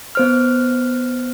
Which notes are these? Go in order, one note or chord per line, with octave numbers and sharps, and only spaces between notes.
B3 C5 F6